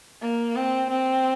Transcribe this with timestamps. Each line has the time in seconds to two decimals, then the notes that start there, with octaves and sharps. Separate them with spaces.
0.22 A#3
0.56 C4
0.90 C4